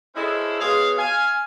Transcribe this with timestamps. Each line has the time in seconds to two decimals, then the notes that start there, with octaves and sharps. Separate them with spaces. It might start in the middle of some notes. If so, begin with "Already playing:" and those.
0.16 G#3 C#4 E4 A4 C5
0.60 B2 F4 G#4 C#5 F5
0.97 F5 G#5